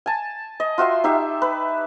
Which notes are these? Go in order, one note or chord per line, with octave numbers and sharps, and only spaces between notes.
G#5 A5
D#5
F4 F#4 E5 C6
D#4 G4 E5
B4